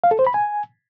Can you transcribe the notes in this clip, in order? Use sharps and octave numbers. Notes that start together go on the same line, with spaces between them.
F5
A4
C5
B5
G#5